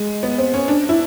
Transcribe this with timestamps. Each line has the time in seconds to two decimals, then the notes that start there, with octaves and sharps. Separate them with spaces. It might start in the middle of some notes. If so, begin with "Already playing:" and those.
Already playing: G#3
0.23 B3
0.38 C4
0.54 C#4
0.68 D4
0.89 E4